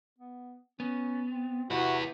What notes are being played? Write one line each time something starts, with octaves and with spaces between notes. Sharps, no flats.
B3
B3 C#4
C4
C3 B3 E4 F#4